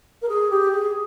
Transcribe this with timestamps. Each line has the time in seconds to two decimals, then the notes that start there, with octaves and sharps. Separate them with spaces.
0.22 A#4
0.29 G#4
0.50 G4
0.71 G#4